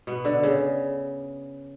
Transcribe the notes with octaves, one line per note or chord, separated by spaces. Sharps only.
B2 B3
D3
C#3